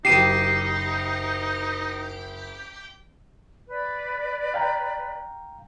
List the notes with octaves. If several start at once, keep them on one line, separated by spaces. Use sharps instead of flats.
F#1 D#4 G4 C7 D#7 E7
B4 D5
F5 G5 A#5